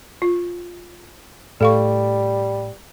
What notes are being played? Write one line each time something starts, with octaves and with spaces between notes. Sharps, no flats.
F4
A2 G3 A4 F5 C#6